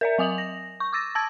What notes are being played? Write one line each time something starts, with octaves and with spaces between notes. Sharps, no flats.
A#4 D5 E5
F#3 G#5 D#6 F7 F#7
A#6
C#6
D6 E6 A6 A#6
A5 E6 G#6 A6